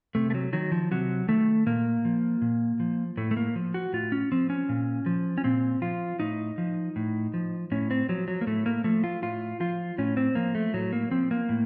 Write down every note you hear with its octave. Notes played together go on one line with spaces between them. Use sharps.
C3 A3
A3
F#3
D#3 F#3
F3
C3 F#3
D#3 A3
A#2 A#3
F3
A#2
F3
A2 A3
A3
A#3
F3
F#4
A2 F4
C#4
F3 C4
C#4
A#2
F3
C#4
A#2 C4
F3 F4
A2 D#4
F3
A2
F3
A2 C#4
C4
F3 F#3
F#3
A#3
A2 A3
A#3
F3 A3
F4
A2 F4
F3 F4
A2 C#4
C4
F3 A#3
A3
A2 F#3
A#3
F3 C4
A#3
A2